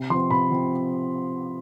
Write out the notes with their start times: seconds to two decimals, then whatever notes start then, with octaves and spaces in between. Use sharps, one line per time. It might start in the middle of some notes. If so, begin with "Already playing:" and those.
Already playing: C3
0.10 F3 C6
0.14 C4
0.31 C3 B5
0.51 F3 C4